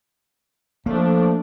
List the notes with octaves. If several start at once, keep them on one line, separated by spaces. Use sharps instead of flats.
F3 A3 A#3 D4